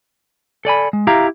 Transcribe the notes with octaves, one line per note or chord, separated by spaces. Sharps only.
A4 D5 G#5 B5
G#3
E4 G4 E5 F5 A#5